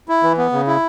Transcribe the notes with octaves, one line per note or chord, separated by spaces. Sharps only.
E4
E3
B3
C#3
E4